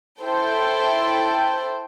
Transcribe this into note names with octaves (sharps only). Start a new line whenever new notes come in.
E4 A4 C5 G5